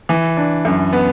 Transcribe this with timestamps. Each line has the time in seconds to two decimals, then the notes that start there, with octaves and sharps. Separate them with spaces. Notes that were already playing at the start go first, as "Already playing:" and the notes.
0.09 E3
0.37 D4
0.65 F#2
0.93 B3